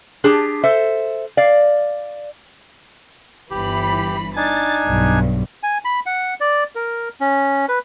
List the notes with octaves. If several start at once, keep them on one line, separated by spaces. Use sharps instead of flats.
D4 G4 G#4 A5
A4 C5 E5
D5 F5
G1 E3 G4 B5
D4 D#4 G#5 A6
B1 G2
G#5
B5
F#5
D5
A#4
C#4
B4